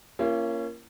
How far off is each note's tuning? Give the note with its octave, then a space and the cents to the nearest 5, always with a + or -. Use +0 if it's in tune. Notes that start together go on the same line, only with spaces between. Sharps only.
A#3 +0 C#4 +0 F4 -45